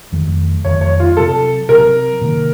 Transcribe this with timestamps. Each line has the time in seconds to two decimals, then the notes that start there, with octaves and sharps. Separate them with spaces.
0.12 F2 D#3 F#3 A3
0.65 F2 D#3 F#3 A3 C#5
0.81 C#5
1.00 F4
1.17 C3 F#3 C4 A4
1.69 C3 F#3 C4 A#4
2.21 C3 D#3 A#3